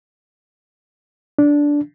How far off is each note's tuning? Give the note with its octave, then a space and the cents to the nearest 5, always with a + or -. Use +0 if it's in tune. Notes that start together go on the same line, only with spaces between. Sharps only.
D4 -10